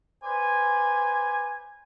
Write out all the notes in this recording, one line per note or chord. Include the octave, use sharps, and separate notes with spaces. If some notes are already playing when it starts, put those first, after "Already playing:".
B4 C5 D5 G#5